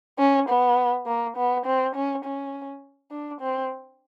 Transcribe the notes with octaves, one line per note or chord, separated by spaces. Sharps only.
C#4
B3
A#3
B3
C4
C#4
C#4
D4
C4